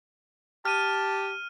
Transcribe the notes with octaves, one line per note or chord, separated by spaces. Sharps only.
G4 A5 F6 D#7